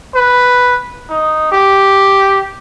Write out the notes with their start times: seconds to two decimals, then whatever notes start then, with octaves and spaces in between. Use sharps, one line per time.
0.15 B4
1.09 D#4
1.52 G4